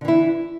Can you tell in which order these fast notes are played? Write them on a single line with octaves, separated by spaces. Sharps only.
D3 E3 E4